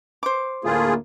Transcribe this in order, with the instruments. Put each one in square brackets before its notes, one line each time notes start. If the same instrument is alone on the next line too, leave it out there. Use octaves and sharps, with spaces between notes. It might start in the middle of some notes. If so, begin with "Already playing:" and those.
[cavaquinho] C5 D6
[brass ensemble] D2 A2 A#3 [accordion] A3 F4 G#4